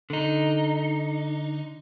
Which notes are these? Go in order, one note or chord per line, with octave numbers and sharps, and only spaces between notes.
D3 D#4